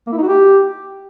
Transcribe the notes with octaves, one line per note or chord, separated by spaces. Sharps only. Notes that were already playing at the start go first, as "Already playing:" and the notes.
A#3
E4
D#4
F#4
G4